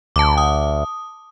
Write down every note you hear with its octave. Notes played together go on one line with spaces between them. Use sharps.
D2 A5 D6
D#6